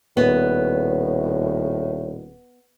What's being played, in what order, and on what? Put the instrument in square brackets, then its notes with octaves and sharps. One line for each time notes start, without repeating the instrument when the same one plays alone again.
[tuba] D#1 [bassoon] A2 [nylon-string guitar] B3